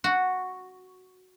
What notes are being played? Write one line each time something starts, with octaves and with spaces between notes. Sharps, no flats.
F#4